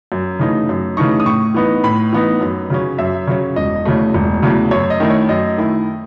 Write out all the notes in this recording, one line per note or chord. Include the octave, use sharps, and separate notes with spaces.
F#2
C#3 E3 A3 D#4
F#2
C#3 E3 A3 D#4 C#6
D#6
A2 C#6
E3 B3 D#4
A2 B5
E3 B3 D#4
F#2
C#3 F#3 C#4
F#2 E5
C#3 F#3 C#4 C#5
E1 D#5
E2 C#3 F#3 A3
E1
E2 C#3 F#3 A3
F#2 C#5
D#5
D#3 A3 E4
C#5
F#2 D#5
D#3 A3 E4